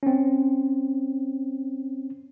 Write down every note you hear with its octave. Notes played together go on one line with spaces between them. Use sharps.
C4 C#4